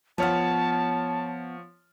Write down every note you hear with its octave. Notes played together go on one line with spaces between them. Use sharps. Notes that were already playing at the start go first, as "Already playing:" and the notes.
F3 B3 C#5 F#5 A5 F6